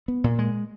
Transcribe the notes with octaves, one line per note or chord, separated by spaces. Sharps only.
B3
A#2
G#3